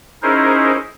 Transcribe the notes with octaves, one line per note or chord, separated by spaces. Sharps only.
C#4 D#4 E4 G#4 A#4 C5